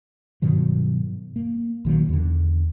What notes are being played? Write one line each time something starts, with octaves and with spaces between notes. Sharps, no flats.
G2 B2 D#3 F#3
A#3
A#1 D#3 F#3 A#3
E2 D3